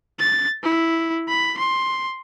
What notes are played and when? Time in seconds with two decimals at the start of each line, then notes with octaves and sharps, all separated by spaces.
0.19 A6
0.64 E4
1.28 B5
1.58 C6